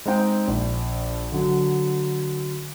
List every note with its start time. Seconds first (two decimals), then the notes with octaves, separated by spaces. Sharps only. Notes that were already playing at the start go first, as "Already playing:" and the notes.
0.06 G#3 C4 D#4 G5
0.48 A#1
1.32 D3 F#3